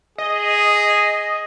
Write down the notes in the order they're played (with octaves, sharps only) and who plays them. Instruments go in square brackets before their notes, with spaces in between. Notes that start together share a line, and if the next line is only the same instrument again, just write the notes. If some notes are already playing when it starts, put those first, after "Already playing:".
[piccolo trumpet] G#4 [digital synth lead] D#5